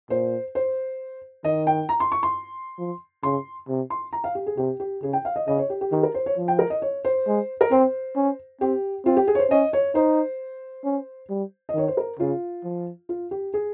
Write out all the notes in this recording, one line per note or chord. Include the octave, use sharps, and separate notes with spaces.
A#2 C5
C5
D#3 D#5
G5
A#5
C6
C#6
C6
F3
C#3 C6
C3
C6
A#5
F5
G4
G#4
C3 G4
G4
C#3 G#4
G5
F5
D#5
C#3 D#5
C#5
G4
G4
D#3 G4
A#4
C5
C#5
F3
G5
A#4
D#5
C#5
C5
G#3
A#4
C4 C5
C#4
C4 G4
C4 F4
G4
G#4
C#5
C5
C#4 D#5
C#5
D#4 C5
C#4
G3
D#5
D#3 C#5
C5
A#4
C#3 F4
F3
F4
G4
G#4